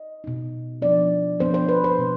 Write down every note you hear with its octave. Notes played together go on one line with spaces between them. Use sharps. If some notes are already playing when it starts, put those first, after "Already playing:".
Already playing: D#5
B2 B3 D#4
F3 B3 D4 D5
F3 B3 D4 C5
C5
B4
C5
B2 B3